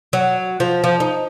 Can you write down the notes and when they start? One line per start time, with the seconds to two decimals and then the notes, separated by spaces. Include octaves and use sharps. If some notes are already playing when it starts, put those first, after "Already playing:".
0.13 F#3
0.60 F3
0.84 F3
1.00 D#4